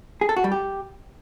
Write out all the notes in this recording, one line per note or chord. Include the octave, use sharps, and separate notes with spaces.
G#4
A4
F#4
G3
G4